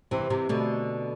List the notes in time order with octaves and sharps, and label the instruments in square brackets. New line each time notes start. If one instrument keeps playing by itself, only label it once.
[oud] C3 E3 [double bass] C4
[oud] C3 E3
[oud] B2 D3 [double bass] A3